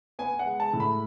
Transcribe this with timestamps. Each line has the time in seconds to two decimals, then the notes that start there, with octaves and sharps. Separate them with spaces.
0.19 B3 G#5
0.39 F#5
0.46 G#3
0.60 A5
0.73 A2
0.80 B5